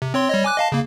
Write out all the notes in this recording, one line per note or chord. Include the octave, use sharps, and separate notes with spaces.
C3
C4 C#5 C6
G3 C#5 D#5
G#5 D6 F#6
D#5 F5 A5
C#3 A#3